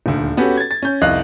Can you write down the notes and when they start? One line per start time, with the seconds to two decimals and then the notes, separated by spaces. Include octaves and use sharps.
0.06 D#1 D2
0.37 B3 C#4 F#4 G4 A4
0.57 G#6 A6
0.71 A6
0.82 C#4 G6
1.02 F1 C2 D#5 F5 F#6